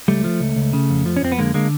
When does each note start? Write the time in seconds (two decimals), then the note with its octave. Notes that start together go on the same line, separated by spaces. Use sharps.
0.08 C#2 G3 A3
0.24 F3
0.40 C#2
0.56 C#2
0.73 C#3
0.90 F2
1.06 F3
1.16 C#4
1.22 F2 C4
1.32 B3
1.39 D3 G#3 A#3
1.54 D3 G#3 A#3